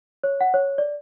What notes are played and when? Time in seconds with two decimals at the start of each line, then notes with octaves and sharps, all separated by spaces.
0.23 C#5
0.41 F#5
0.54 C#5
0.78 D5